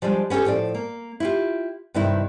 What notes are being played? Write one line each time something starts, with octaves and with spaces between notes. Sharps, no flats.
F3 G3 G#3 D4
B3 C#4 F#4 G4 A4
A2 F3 A4 D5
A#3
E4 F4 G4
G2 C3 D#3 D#4 E4